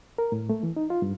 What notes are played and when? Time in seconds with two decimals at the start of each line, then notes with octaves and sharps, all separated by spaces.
0.18 A#4
0.32 A2
0.49 A3
0.63 E3
0.76 D#4
0.90 F4
1.02 G2